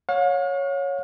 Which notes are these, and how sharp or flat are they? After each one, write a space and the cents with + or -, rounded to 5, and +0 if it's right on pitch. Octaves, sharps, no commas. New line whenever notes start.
C#5 +0 F5 +45